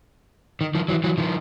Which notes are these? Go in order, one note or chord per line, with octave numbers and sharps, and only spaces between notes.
D#3
D#3 F3
E3 F#3
E3 F#3
D#3 F3